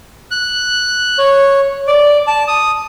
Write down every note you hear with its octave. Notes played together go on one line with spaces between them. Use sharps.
F#6
C#5
D5
A5
D#6